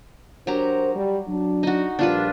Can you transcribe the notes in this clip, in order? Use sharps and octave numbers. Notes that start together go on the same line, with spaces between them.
F#3 D4 G4 A#4 C5 A#5
G3
F#3 D4
D#4 F#4
A#1 G3 D4 F4 B4